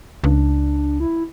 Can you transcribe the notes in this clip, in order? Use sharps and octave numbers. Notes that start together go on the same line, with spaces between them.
C#2 D4
E4